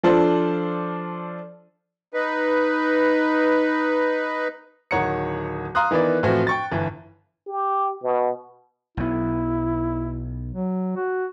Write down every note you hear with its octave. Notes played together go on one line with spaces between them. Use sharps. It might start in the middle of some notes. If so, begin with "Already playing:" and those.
F3 D4 F4 A4 C5 D5
D#4 B4
D1 D#3 C#5 F#5 A#5 C#7
F5 A#5 C6 D#6 F#6
D#3 E3 B3 E4 D5
A2 E3 F3 C4 F#4
G5 C#6 A6
G1 E3
G4
B2
B1 B3 E4
F#3
F#4